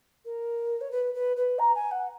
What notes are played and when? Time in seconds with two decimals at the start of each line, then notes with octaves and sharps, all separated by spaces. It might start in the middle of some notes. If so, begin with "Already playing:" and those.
0.24 A#4
0.80 C#5
0.91 B4
1.14 B4
1.36 B4
1.58 A#5
1.74 G#5
1.91 F#5